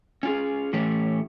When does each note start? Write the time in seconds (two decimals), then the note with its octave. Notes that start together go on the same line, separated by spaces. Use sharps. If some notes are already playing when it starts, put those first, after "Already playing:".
0.23 C#4 F4 G#4
0.73 A2 E3 A3 C#4 G4